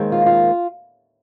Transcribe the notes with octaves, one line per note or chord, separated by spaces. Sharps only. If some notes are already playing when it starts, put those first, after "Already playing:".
Already playing: D#2 D#3 G#3 C4
F4
F4